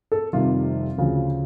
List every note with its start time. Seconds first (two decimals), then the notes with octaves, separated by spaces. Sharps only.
0.12 A4
0.33 F1 F2 C3 D#3 G3 F4
0.98 D2 C#3 F3